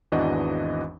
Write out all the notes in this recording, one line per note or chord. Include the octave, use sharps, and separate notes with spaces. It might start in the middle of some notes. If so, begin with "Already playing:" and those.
G#1 E2 E3 D4 F#4 D#5